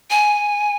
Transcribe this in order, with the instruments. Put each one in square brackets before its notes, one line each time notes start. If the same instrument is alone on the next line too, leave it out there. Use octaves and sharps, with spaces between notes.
[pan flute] G#5